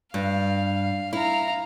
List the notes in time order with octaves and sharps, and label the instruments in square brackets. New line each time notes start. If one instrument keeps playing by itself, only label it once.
[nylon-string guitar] G2 [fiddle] F5
[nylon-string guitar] E4 [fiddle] F5 A#5